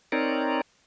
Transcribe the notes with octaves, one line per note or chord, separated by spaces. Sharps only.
C4 D#4 A#4 C#5 D5